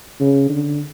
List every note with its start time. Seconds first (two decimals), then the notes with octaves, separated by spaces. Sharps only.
0.20 C#3
0.49 D3